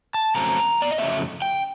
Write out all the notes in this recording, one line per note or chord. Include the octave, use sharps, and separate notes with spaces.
A5
F2 C#3 F#3 A3 C4 A#5
D5
D#5
F2 C#3 F#3 A3 C4 E5
G5